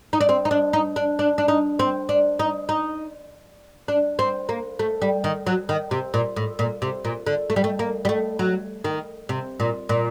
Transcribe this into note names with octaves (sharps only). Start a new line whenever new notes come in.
D#4
D4
C4
D#4
D4
D#4
D4
D4
D4
D#4
C4
D4
D#4
D#4
D4
C4
A#3
A3
G3
D#3
F#3
D#3
C3
A#2
A2
A#2
C3
A#2
D3
A3
G3
A3
A#3
G3
A3
F#3
D#3
C3
A#2
A#2